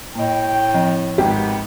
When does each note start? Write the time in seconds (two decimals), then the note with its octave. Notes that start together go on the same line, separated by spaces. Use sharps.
0.15 A2 A#3 D#5 G5
0.74 F3 C4 D#5
1.18 G#1 B3 G4